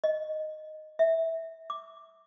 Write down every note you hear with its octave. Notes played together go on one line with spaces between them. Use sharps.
D#5
E5
D6